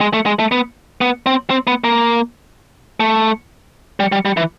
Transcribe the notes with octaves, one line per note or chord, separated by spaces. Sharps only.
G#3
A3
G#3
A3
B3
B3
C4
C4
B3
A#3
A3
G3
G3
G3
E3